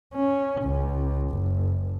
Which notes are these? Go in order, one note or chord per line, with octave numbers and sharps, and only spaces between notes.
C#4
C#2
F#1